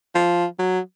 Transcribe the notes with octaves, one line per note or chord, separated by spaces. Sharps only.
F3
F#3